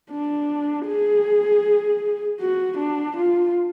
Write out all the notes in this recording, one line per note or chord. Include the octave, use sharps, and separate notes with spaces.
D4
G#4
F#4
D4
F4